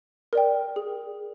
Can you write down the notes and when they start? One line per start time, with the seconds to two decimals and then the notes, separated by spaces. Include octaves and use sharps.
0.33 A#4 D5 G5
0.76 G#4